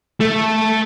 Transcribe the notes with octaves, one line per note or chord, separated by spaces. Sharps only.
A3